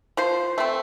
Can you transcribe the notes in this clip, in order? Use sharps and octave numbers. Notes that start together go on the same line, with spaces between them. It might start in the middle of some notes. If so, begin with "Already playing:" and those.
F3 C5
A3 C4